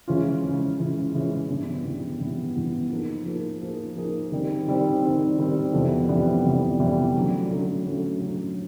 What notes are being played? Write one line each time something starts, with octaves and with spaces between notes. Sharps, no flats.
C#3 E3 G#3 C#4 F4
C#3 E3 G#3 C#4 F4
C#3 E3 G#3 C#4 F4
C#3 E3 G#3 C#4 F4
G2 E3 G3 B3 E4
G2 E3 G3 B3 E4
G2 E3 G3 B3 E4
G2 E3 G3 B3 E4
F3 A#3 D#4 G#4
F3 A#3 D#4 G#4
F3 A#3 D#4 G#4
F3 A#3 D#4 G#4
D#3 G3 C4
D#3 G3 C4
D#3 G3 C4
D#3 G3 C4
F2 C3 E3 G3 B3
F2 C3 E3 G3 B3
F2 C3 E3 G3 B3
F2 C3 E3 G3 B3
D3 F#3 A3 C#4
D3 F#3 A3 C#4
D3 F#3 A3 C#4
D3 F#3 A3 C#4